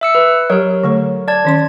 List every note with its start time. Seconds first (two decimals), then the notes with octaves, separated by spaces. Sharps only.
0.01 E5 E6 C#7
0.15 B4
0.50 F#3 G4 A#4 C#5
0.83 D3 A3 A4
1.28 D5 A5 G#6
1.45 D#3 C#4 C6